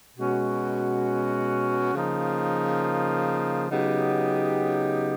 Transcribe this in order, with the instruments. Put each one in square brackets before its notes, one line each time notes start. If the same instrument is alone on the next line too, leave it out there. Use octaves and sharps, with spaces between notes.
[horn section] B2 G#3 C#4 F#4
C#3 F3 A#3 D#4
C#3 F#3 B3 D#4 G4